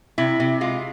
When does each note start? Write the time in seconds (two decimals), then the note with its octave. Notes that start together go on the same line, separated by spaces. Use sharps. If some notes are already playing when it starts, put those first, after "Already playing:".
0.18 C3 E4
0.40 C3
0.61 G#3 F4